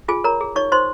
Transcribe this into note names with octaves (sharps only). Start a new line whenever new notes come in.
F4 G#4 G#5
A#4 C#5 A#5
G#4
D#4 C#5 C#6
D#4 C5 C6